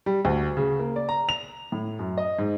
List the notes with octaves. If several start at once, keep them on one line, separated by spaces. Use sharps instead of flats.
G3
D2
C#3
A#3
D5
A#5
F7
A2
F#2
D#5
G#2